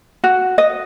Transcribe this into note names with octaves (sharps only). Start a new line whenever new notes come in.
F#4
D#5